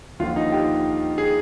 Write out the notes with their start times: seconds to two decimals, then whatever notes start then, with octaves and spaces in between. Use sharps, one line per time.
0.19 D#2 D3 F3 F4
0.36 D#4
0.52 G4
1.18 G#4